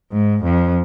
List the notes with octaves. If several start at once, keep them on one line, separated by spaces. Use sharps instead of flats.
G#2
F2